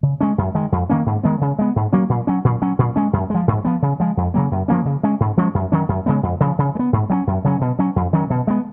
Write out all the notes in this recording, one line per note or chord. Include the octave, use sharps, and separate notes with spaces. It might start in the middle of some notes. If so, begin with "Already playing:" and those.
C#3
G#3 C#4
F#2
D#3 G#3
F2
D#3 A#3 C#4
G#2
D#3 G#3 B3
C#3
G#3 B3
G#2
F#3 A#3 C#4
A#2
F#3 C#4
A#2
F#3 C#4
A#2
G#3 C#4
F#2
F3 G#3
G#2
F3 B3
C#3
F3 G#3
F2
C#3 F#3 A#3
F#2
F3 A#3 C#4
C#3
G#3 C#4
G#2
F3 G#3 C#4
F#2
D#3 F#3 C#4
F#2
C#3 G#3 B3
F2
C#3 F3
C#3
G#3
B3
G#2
F#3 A#3 C#4
F#2
C#3 F#3 C#4
B2
F#3 C#4
F2
D#3 F#3 C#4
B2
G#3 B3